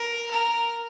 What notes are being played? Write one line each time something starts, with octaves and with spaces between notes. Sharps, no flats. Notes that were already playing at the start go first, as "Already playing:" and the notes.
Already playing: A#4
A#4